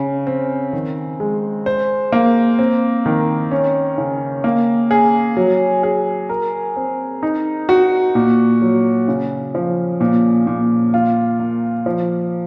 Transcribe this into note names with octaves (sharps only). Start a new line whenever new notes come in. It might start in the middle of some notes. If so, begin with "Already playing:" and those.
Already playing: C#3
C4
D#3
G#3
C5
A#3
C4
D#3
C#4
C#3
A#3
G#4
F#3
G#4
A#4
C4
D#4
F#4
A#2
F#3
C#3
F3
A#2
A#2
F4
A#3
F3